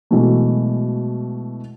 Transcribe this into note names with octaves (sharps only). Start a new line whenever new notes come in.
B2 E3 F#3 G#3 A3